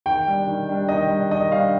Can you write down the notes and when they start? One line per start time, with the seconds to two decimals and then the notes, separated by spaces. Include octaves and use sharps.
0.06 D#3 G5
0.27 G3 D4
0.48 D#3
0.69 G3 D4
0.88 D#3 D#5
1.10 G3 D4
1.31 D#3 D#5
1.51 G3 D4 F5